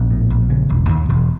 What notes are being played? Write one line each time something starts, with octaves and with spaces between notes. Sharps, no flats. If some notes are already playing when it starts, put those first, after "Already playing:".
Already playing: A#1 B3
A2
A#1
C#3
E1
D#2
E1